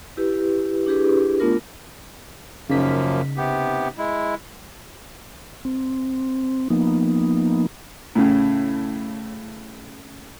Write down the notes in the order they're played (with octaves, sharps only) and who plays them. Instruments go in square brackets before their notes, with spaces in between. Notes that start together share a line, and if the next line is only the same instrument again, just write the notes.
[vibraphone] E4 G4 B4
D4 E4 G4 G#4 B4
A3 B3 D4 F4 A#4
[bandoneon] F#2 F3 A#3 [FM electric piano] C#3 D#4 B6
[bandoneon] C3 B3 G4
G#3 E4
[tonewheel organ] C4
F3 A#3 B3 D#4
[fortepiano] A2 C#3